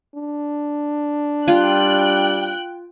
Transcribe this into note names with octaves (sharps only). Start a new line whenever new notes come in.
D4
G3 F4 G5 F#6